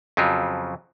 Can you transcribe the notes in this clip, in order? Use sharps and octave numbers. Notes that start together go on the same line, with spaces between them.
F2 C#3 F3 F#3